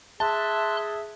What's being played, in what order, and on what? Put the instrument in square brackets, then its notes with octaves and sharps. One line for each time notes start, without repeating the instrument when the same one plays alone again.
[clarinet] G#4 [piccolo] E5 [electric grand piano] A5 [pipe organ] C6 F#6